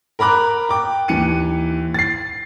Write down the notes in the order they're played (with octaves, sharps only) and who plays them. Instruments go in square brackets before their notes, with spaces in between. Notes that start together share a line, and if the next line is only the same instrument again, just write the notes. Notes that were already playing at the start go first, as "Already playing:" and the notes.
[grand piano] A#4 A#5 B5 D6 F#6
G5 D6
D#2 E3 C#7 D#7
A6 C7